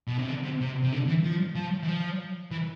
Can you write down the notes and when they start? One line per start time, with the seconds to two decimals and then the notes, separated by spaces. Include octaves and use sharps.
0.08 B2
0.19 C3
0.29 D3
0.44 C3
0.61 C3
0.84 C3
0.93 D3
1.08 E3
1.24 F3
1.56 F3
1.83 E3
1.88 F3
2.51 E3